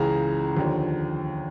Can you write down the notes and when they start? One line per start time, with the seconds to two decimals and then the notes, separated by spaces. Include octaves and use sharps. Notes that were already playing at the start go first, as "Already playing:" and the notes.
Already playing: C#2 C#3 E3 A#5
0.57 D#2 D3 F3